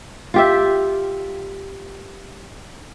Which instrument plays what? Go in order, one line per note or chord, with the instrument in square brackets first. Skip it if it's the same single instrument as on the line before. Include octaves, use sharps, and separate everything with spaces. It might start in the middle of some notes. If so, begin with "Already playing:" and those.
[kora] F4 G4 E5